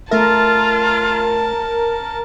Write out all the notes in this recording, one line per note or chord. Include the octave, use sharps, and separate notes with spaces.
A3 F4 A#4 E5 A5